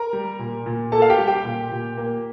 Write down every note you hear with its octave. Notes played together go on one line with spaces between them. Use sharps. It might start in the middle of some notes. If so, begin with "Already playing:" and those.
Already playing: A#4 A#5
G3
A#2
A#2
A#3 A4 A5
F5
G4 G5
G3
G4 G5
A#2
A#2
A#3